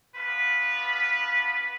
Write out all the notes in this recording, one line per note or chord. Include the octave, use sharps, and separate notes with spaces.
B3 D4 F4 B4